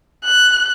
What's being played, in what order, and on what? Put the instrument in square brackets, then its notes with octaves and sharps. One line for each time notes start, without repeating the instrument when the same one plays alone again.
[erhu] F#6